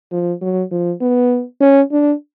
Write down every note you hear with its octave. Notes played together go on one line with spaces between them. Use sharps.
F3
F#3
F3
B3
C#4
D4